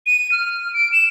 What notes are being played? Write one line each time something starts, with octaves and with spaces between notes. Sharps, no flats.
D#7
F6
D7
E7